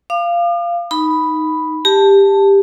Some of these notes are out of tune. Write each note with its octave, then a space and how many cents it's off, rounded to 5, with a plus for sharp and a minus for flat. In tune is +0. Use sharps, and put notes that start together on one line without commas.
F5 -15 D6 +45
D#4 +0 B5 +0
G4 +15 A5 +0